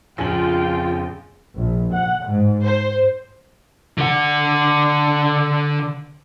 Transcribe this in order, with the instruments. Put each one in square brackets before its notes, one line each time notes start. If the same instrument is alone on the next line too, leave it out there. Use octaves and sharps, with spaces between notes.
[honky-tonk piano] A#1 G#5 F#7 [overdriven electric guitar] F2 [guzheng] C#3 [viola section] F4 G5
[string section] A#1
F#5
G#2
C5
[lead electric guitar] D3 F#5